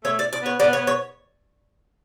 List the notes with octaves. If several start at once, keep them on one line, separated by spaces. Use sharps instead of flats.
A3 C#5
D5
D5
B3 C#5
B3 D5
C#5
B3
C#5